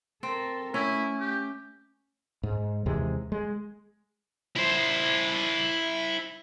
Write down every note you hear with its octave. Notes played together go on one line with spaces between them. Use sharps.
C4 A4 A#4
A3 C#4 E4
G4
G#2
D#2 C3 E3 G#3
G#3
E4 C5